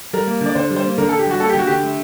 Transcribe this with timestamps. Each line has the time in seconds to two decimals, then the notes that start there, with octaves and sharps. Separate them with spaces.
0.13 G3 A#4
0.28 A#3
0.41 D3 D5
0.55 D3 C5
0.70 G3
0.76 C5
0.84 A#3
0.98 D3 A#4
1.09 A4
1.12 D3
1.19 G4
1.27 G3 F#4
1.40 A#3 A4
1.50 G4
1.54 D3 F#4
1.67 D3 G4
1.83 A3